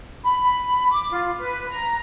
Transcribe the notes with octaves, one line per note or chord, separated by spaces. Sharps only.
B5
B5
D6
F4
B4
A#5